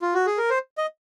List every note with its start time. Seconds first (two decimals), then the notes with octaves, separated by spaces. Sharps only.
0.02 F4
0.14 F#4
0.26 G#4
0.38 A#4
0.50 C5
0.78 D#5